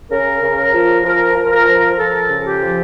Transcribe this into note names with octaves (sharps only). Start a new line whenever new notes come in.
C#3 A#4
C#3
A#4
F3
F3 A#4
F3
A#4
F3
F3 A4
C#3
G4
F3